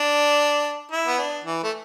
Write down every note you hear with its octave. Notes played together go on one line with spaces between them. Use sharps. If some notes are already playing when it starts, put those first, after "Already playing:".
Already playing: D4
E4
B3
D4
E3
A3